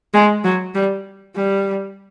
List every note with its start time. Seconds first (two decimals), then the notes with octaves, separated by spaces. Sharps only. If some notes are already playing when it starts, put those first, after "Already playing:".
0.14 G#3
0.44 F#3
0.75 G3
1.36 G3